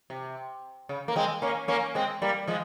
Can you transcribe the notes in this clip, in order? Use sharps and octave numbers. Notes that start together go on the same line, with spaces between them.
C3
C#3
A#3
G#3 C4
A#3 C#4
A#3 C#4
G#3 C4
G3 A#3
F3 G#3